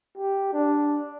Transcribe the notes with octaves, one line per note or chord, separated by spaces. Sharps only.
G4
D4